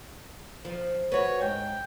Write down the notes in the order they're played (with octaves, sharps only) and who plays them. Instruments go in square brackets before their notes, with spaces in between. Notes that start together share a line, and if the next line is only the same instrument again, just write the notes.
[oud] F3
[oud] F#4 B4 [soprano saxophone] C#5
[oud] G#2 [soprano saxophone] G5